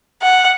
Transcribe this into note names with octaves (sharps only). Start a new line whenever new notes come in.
F#5